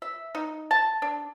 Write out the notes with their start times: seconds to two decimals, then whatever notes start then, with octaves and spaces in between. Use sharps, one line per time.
0.02 E5
0.35 D#4
0.71 A5
1.02 D4